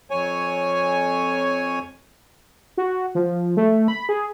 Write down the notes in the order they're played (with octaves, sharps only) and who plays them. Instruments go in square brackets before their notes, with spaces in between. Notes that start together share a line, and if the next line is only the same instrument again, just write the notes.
[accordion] F2 C#5 G#5
[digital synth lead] F#4
F3
A3
B5
G#4